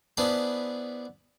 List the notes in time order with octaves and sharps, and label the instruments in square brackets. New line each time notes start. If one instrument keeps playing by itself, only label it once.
[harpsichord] B3 D4 E4 G#4 C5